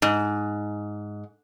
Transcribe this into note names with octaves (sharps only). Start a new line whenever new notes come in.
G#2